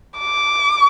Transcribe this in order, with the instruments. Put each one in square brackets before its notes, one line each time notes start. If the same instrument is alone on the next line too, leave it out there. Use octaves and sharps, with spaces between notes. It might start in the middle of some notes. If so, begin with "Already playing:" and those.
[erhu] D6